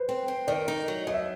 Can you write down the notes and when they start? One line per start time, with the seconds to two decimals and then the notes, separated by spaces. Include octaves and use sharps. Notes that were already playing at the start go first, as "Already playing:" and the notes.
Already playing: B4 C5
0.09 C4
0.28 C4
0.47 D#3 D5
0.68 D#4
0.88 F#3
1.07 F#3 D#5
1.14 E5